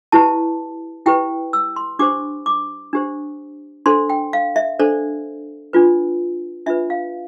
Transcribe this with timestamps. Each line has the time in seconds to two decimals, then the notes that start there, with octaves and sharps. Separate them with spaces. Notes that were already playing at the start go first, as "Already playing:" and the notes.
0.12 E4 G4 B4 A5
1.06 E4 G4 B4 G5
1.53 E6
1.76 C6
1.99 D4 G4 C5 D6
2.46 D6
2.93 D4 G4 C5
3.86 D4 A4 C5 C6
4.10 G5
4.33 F5
4.56 E5
4.79 D4 A4 C5 D5
5.73 D4 F4 B4
6.66 D4 F4 B4 E5
6.90 F5